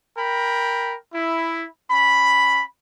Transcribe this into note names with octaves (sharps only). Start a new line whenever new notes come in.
A#4 G5 B5
E4
C#4 B5